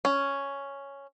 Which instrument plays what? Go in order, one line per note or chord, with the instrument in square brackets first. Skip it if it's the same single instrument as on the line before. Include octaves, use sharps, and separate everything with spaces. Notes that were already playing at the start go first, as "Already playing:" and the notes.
[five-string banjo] C#4